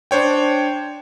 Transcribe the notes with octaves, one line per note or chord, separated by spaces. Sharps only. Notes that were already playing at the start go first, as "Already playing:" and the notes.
D4 C5 C#5 G5